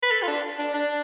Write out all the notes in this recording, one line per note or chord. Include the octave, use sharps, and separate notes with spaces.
B4
A4
F4
D4
D4
D4